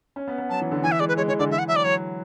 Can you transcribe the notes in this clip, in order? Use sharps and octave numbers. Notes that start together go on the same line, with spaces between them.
C#4
B3
B3
F#3 A5
E3
D3
E3 G#5
E5
G#3 D5
B4
G#3 C#5
E3 C#5
D3 D5
E3 E5
F#5
F#3 E5
D5
F#3 C#5